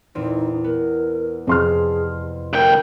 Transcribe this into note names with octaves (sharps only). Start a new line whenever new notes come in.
E2 A#2 C4 D#4
B3 A#4
F2 C3 G#4 A5 C6 F6
D2 A#4 G5